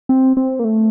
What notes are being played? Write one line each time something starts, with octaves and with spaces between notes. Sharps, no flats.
C4
C4
A#3
A3